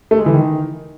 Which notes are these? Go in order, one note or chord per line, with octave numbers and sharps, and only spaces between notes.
A3
G#3
E3
D#3